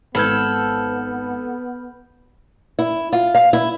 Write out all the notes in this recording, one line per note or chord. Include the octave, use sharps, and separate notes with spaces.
G#1 B3 A4 B4 B5 F6 G6 G#6
E4
F4
F5
E4